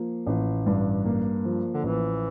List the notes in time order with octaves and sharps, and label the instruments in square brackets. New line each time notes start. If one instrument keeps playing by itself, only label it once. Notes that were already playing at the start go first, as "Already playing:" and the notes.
Already playing: [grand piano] F3 A#3
A1
G2
A#3
F3
[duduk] D3
[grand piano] A1 [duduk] E3